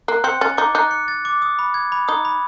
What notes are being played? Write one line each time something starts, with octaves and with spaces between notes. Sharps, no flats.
A#3 F#6
C4 C#7
C#4 A6
D#4 D6
D#4 F#6
C#7
A6
D6
D#6
B5
G#6
B5
D#4 D#6
B5